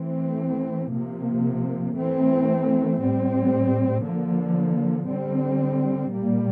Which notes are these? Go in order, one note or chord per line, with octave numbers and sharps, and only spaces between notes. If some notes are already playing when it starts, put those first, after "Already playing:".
Already playing: E3 A3 C4
C3 F3 A#3
E3 A3 C4
A2 G3 C4
D3 F3 A#3
D3 G3 C4
A#2 G3 A#3